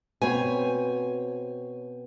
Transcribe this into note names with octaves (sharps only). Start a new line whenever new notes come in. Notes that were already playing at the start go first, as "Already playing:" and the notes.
B2 C4 C#5 G#5